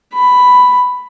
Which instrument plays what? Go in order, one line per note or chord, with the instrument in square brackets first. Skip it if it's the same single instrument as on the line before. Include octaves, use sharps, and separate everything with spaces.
[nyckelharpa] B5